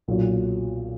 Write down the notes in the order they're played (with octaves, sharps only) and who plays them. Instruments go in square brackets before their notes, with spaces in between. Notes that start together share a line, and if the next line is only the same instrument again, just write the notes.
[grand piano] B1 A#2 F#3